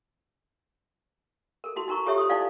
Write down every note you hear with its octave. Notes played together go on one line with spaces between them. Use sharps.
A4 A#4
E4 F#4 C6
D#4 F#4 A#4 A#5 C#6 D6
F4 G4 A4 C#5 E5
C5 D#6
D4 E4 F4 A4 D5 F5